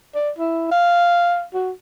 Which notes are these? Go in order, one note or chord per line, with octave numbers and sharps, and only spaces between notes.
D5
E4
F5
F#4